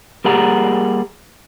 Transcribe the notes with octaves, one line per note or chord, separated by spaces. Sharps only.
G3 A#3 G4 G#4 F#5 A#5